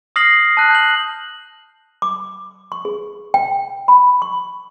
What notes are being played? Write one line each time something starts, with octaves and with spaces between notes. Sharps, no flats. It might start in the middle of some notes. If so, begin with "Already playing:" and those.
D#6 F6 A#6 C7 F#7
A5 F#6
G6 F#7
D6
C#6
G#4
G5
B5
C#6